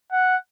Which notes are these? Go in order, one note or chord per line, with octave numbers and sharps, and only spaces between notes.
F#5